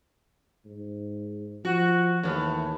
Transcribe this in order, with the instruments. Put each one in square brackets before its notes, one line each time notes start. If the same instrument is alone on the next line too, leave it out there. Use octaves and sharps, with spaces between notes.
[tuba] G#2
[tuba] F3 [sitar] F#4
[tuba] D#2 [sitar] A2 E3